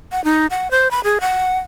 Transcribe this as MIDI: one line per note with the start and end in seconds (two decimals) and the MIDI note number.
0.12 0.24 78
0.24 0.46 63
0.51 0.71 78
0.71 0.90 72
0.91 1.01 83
1.04 1.19 68
1.21 1.58 78